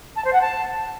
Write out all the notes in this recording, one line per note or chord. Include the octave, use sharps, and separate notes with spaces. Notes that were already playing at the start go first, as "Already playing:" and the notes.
A5
C5
F#5
A5